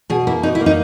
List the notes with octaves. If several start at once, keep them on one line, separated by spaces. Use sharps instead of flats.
B2 G#4
A#3 E4
B2 D#4
E4
A#3
D#4